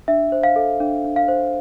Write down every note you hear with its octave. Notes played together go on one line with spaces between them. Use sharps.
D4 E5
C5
F5
A4
D4
D4
F5
C5